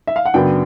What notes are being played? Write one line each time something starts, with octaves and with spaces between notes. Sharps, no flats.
E5
F5
F#5
F#2 C#3 F#3 B3 D4 G5